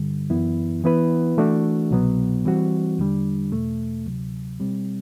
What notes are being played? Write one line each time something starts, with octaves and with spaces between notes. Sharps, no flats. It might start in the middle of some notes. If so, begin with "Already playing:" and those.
Already playing: G2 D3 G3
F#2 E3 B3 E4
E3 B3 E4 B4
E3 A3 D4 F#4
C2 B2 F#3 B3
E3 G3 C4 F#4
E2 D3 G3 D4
E2 B2 A3
D2 C3 F#3
B2 G3 C4